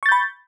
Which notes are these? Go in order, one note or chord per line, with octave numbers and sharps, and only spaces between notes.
B5 C#6 G6 A6